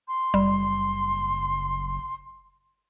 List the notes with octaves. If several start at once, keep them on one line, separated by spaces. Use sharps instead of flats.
C6
F#1 G3